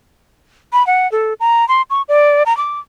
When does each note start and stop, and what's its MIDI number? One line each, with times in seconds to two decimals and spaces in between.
0.73 0.85 83
0.87 1.10 78
1.12 1.34 69
1.40 1.67 82
1.69 1.82 84
1.90 2.02 85
2.09 2.43 74
2.46 2.56 82
2.57 2.80 86